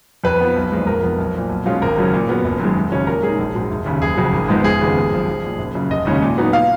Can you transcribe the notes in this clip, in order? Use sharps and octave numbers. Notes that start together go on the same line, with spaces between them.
F2 B4
F3 B3
B1
A#2 F3 G#3
F1 A#4
F2 F3 B3
B1
A#2 F3
B1
B2 G#3 C#4 F4
G#1 A#4
F#2 C#3 F#3 C#4
A#2
F#3 B3
F#1
F#2 D#3 G#3
F1
D#2 C#3 F#3 C#4
A#2 A#4
G#3 D#4 G#4
A#1 G#4
G#2 F#3
F1
D#2 C#3
F#1 G#4
F2 C#3 F#3
G#1
G#2 F3 G#3 B3
F1 G#4
D#2 C#3 F3 B3
G#1
F#2 F3
B1
A#2 F3
F#1
F#2 C#3
F1 D#5
D#2 C#3 G#3 C#4
A#2
F#3 B3 D#4
F5